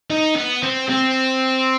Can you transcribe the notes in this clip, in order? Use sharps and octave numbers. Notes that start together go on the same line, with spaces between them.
D#4
B3
C4
C4